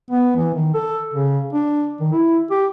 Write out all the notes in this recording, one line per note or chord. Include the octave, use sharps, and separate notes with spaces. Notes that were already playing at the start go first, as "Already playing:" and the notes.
B3
E3
D#3
A4
C#3
D4
D#3
E4
G4